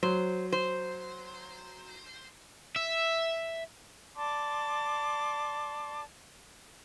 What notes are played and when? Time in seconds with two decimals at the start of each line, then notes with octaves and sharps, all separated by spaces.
0.03 F#3 C5
0.52 C5
2.76 E5
4.16 D5 A5 C6 D6